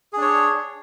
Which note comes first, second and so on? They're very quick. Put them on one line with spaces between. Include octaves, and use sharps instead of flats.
G#4 D4 C#5